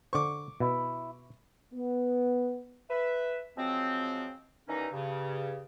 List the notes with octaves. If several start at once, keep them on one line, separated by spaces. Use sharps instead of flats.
D3 C5 C#6 D6
B2 E4
B3
B4 E5
F3 F#3 G#3 C4
D#2 E3 G3 C#4 D#4
G2 C#3